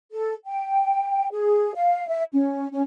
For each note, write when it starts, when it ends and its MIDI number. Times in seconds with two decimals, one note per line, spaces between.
0.13 0.33 69
0.46 1.27 79
1.32 1.72 68
1.75 2.08 77
2.08 2.23 76
2.33 2.68 61
2.72 2.82 61